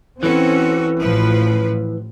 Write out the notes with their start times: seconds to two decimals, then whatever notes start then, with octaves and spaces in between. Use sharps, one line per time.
0.23 E3 C4 C#4 F#4 A4
0.98 A1 A2 F3 B4